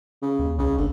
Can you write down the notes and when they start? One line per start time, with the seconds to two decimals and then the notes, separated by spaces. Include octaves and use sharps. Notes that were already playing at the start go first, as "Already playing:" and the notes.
0.22 C#3
0.39 D#2
0.58 C2 C#3
0.78 F#1 D3